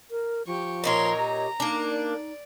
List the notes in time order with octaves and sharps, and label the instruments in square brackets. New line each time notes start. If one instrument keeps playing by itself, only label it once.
[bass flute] A#4
[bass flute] F3 [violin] G4 C#6
[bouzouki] A#2 D#4 C#5 [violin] A#4 C6
[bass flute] G4 [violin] A#5
[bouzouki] A#3 D4 [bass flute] D#4
[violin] D5